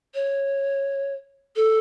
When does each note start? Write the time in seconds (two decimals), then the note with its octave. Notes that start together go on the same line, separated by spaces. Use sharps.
0.15 C#5
1.56 A4